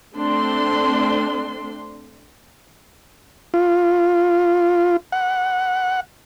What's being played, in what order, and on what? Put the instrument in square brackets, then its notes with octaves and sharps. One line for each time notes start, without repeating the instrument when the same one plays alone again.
[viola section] A3 C4 D4 C6
[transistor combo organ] F4
F#5